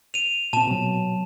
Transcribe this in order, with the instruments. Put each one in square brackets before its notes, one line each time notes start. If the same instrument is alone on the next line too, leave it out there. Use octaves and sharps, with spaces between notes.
[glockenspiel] D#7 F7
[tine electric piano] A#2 C4 [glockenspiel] A5 E7
[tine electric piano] B2 F#3